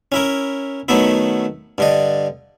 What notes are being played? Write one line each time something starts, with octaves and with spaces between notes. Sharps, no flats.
C#4 E4 A#4
D#3 F#3 A3 B3 E4
G2 D3 D#5